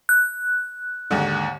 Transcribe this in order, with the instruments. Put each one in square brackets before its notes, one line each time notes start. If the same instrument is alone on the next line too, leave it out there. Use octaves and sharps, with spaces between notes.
[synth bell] F#6
[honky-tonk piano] D#2 G#2 D3